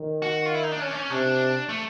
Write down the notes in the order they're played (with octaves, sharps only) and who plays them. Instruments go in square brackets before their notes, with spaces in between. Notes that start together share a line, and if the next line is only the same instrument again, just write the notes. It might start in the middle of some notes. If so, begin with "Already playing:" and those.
Already playing: [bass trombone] D#3
[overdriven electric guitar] F#4
F4
E4
D#4
D4
C#4
D4
C#4
[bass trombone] C3 [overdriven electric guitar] D4
[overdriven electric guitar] A3